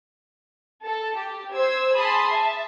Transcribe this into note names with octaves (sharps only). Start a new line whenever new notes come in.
A4
G4
C5 E6 G#6
G#4 A5 B5 C6 D#6
E5 A5